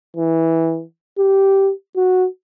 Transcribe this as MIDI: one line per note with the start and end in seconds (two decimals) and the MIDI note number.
0.17 0.83 52
1.19 1.71 67
1.96 2.27 66